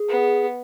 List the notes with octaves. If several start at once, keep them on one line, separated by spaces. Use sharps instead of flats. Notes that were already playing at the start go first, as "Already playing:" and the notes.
Already playing: G#4
B3